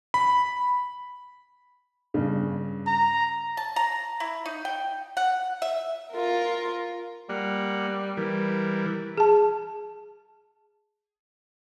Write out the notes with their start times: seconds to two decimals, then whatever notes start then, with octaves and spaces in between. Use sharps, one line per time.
0.14 B5
2.14 G2 C#3
2.87 A#5
3.57 A5
3.76 A#5
4.20 E4
4.46 D#4
4.65 G5
5.17 F#5
5.62 E5
6.12 F4 A#4
7.29 G3 A#3 F#5
8.17 E3 G3 A#4
9.18 G#4 A5